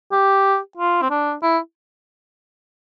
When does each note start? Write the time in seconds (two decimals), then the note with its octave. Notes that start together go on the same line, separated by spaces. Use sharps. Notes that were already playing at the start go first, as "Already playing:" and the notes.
0.12 G4
0.77 F4
1.02 C4
1.11 D4
1.43 E4